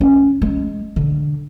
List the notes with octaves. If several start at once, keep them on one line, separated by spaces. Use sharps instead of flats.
C#4
G#3
D3